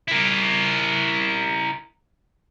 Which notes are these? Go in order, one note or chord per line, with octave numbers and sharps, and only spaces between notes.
E4 A#4